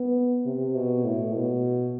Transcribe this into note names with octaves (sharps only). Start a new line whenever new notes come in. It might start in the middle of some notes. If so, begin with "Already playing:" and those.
Already playing: B3
C3
B2
A2
B2